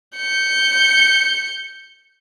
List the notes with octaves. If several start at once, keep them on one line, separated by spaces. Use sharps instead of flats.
G6 C#7